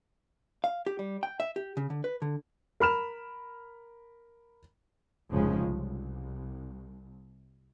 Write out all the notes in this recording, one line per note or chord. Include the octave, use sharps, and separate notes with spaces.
F5
G4
G3
G5
E5
G4
C#3
D3
B4
D3
A#4 B5 F6 E7
F1 G#2 C#3 F3 G#3 C#4
C2